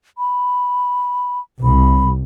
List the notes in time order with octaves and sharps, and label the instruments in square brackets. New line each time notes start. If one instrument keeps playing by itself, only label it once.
[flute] B5
[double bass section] C2 [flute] B5